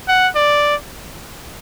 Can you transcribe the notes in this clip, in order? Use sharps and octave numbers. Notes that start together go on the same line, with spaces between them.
F#5
D5